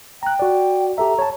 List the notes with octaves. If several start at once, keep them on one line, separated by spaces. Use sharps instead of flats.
G5 A#5 F#6
F#4 D5
G4 A4 E5 A#5
C#5 A5